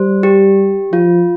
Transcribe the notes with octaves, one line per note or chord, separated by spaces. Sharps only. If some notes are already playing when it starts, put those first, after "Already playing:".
Already playing: G3 C5
G4
F3 F4